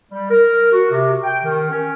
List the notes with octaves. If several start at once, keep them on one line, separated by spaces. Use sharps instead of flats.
G3
A#4
F#4
C3
G5
D#3
C#4